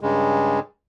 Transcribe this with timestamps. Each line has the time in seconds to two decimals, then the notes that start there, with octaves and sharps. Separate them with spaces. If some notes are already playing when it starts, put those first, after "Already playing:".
0.01 G2 C#3 G#3